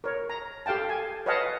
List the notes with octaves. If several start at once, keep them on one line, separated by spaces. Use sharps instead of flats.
A#4 C#5
A#5
G4 A4 F5 G5 A5
G#5
B4 C#5 D#5 F5 F#5 A5